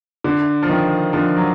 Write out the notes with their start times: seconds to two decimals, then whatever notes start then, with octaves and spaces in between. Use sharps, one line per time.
0.24 D3
0.63 F3
0.69 D#3
1.13 D3 F3
1.37 F#3